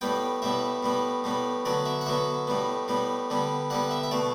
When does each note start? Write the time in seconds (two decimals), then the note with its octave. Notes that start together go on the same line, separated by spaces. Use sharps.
0.01 A2 G3 B3 G5
0.42 A2 G3 B3 E5
0.83 A2 G3 B3
1.24 A2 G3 B3
1.65 D3 F#3 B3 D5
1.86 E5
2.01 F#5
2.06 D3 F#3 B3 E5
2.47 A2 G3 B3
2.88 A2 G3 B3
3.30 D3 G3 B3
3.70 D3 G3 B3 F#5
3.91 E5
4.03 E5
4.11 B2 A3 D5